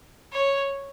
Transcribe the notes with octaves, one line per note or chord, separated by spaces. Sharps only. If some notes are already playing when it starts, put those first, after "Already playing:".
C#5